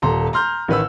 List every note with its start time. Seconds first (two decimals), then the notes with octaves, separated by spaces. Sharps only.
0.02 D#1 A4 A#5 C6
0.33 A#5 C6 F6 G6
0.68 A1 D#3 B4 B5 E6